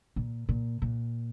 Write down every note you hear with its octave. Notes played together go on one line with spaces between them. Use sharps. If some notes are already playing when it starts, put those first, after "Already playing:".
A#2
A#2
A#2